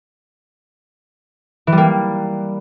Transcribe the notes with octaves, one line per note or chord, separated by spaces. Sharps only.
E3
G3
A#3